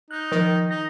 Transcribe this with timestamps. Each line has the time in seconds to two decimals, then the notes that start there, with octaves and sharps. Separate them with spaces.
0.11 D#4 F#6 G6
0.32 D#3 F3
0.71 D#4 A#6